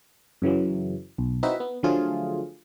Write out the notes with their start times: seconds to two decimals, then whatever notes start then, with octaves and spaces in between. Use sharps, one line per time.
0.42 F#2 C#3 E3 F#3
1.18 B1
1.43 C4 D#4 E4 F#4 B4 E5
1.60 B3
1.83 D3 F3 F#3 A3 F4 G#4